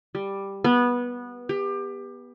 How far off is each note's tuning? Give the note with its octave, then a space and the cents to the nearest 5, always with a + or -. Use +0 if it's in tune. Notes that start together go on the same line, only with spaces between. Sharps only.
G3 +5
B3 -15
G4 +25